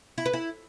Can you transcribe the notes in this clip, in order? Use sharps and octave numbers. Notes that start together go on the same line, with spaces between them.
E4
B4
E4